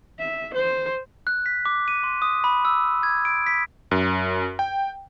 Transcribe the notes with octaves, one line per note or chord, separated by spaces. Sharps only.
E5
C5
F#6
B6
D6
D#7
C6
D#6
B5
E6
G#6
D7
B6
F#2
G5